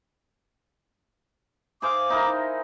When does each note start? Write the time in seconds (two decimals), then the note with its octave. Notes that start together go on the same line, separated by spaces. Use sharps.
1.82 G#4 C5 F5 D6
2.10 D#4 E4 A#4